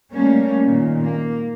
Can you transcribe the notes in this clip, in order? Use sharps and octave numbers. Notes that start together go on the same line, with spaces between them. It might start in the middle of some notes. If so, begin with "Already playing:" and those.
G3 A3 A#3 C#4
A#2 D#3
A#3